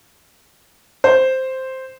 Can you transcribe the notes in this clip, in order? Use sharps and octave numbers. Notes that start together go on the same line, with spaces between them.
C5